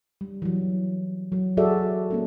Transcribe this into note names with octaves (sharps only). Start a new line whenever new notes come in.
G3
E3 F#3
F#3
F#4 G#4 A4 D5 E5
A#3 C#4 A4